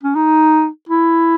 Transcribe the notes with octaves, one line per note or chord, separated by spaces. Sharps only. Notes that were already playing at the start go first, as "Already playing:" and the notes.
C#4
D#4
E4